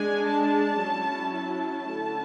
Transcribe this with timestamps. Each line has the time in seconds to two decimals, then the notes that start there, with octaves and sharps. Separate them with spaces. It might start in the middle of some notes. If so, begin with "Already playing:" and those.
Already playing: G#3 D4 G#5
0.26 A5
0.80 F#3 C#4 E4
1.35 A5
1.88 D3 A3 C#4 E4